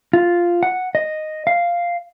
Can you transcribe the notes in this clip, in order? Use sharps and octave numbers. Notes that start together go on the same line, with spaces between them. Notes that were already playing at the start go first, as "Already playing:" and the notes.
F4
F#5
D#5
F5